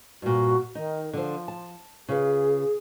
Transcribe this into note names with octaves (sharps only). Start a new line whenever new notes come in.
G2 A#2 F#4
D#3 D#4
D3 F3 C5
A5
C#3 F4 G#4 B4